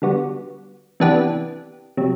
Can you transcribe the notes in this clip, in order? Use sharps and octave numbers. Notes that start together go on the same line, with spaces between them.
D3 G3 B3 F#4
C3 E3 B3 D4 G4
C3 F#3